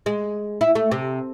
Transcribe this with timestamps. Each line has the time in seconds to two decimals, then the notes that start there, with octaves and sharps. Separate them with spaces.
0.06 G#3
0.61 E4
0.75 A3
0.91 C3